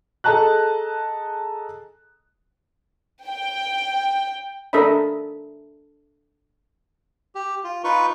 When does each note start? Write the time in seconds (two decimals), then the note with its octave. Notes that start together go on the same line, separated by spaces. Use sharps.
0.24 G#4 A4 D#5 A5 A#5 F#6
3.27 G5
4.73 D4 A4 A#4 D#5 E5 B5
7.35 G4
7.64 F4
7.84 D#4 F4 B4 C#6